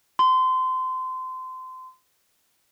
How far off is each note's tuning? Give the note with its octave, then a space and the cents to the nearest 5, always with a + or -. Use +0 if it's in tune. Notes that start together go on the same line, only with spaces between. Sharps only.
C6 -25